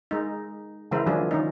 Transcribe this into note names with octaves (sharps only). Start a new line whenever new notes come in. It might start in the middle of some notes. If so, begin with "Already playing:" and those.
G#3 D#4
C#3 E3 G#3 E4 A#4 C5
D#3 F3 F#3 D4 F4 G#4
D#3 C#4 D#4